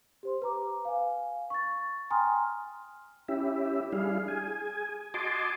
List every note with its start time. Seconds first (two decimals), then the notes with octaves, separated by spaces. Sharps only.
0.23 G4 C5 C6
0.42 B4 A#5 D6
0.85 F5 G#5
1.50 C#6 A6
2.10 G5 G#5 A#5 C6 D#6 F6
3.28 C#4 E4 G4 E5
3.93 G3 D4 E4 G#4 F5
4.28 G#4 G#5
5.14 F#4 D#5 G#5 A5 C6 D6